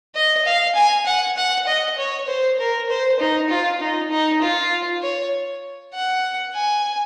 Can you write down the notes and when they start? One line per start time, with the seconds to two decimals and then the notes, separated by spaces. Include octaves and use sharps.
0.15 D#5
0.45 F5
0.75 G#5
1.06 F#5
1.37 F#5
1.67 D#5
1.98 C#5
2.28 C5
2.59 A#4
2.89 C5
3.19 D#4
3.50 F4
3.81 D#4
4.10 D#4
4.42 F4
5.03 C#5
5.94 F#5
6.55 G#5